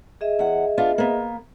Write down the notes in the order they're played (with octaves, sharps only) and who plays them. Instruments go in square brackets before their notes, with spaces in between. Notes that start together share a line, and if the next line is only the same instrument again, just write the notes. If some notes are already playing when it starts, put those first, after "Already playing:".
[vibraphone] G#4 D#5 E5
[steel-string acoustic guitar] E2 F#5
B3 D4 F4
A#3 B3